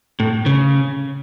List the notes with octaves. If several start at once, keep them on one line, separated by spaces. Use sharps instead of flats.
A2
C#3